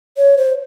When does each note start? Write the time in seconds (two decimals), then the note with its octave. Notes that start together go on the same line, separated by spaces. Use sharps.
0.17 C#5
0.37 C5